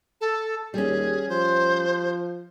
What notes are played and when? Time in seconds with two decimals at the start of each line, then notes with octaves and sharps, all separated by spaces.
0.21 A4
0.74 D#2 G3 C#4 G#4
1.29 F3 C5